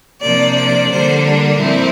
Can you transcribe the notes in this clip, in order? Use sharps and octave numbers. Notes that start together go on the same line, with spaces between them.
C3 F3 A#3 D4 D5
D5
D3 G3 A#3 D4 C5
A#4
A#2 F3 C4 E4